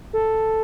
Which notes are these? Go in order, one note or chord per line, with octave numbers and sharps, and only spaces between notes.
A4